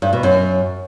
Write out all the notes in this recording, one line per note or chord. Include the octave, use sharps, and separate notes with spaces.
G2
B2
F#2